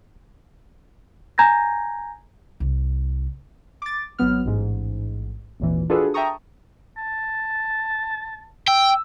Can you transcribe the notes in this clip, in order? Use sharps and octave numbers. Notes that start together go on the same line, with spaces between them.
G#5 A#5 G6 G#6 A#6
C2
D6 A6
G#1 F#3 B3 F6
A1 G#2
G#1 D#2 A#2 E3
D4 F4 F#4 G#4 A4 B4
E5 G5 A5 A#5 C#6 D#6
A5
G5 E6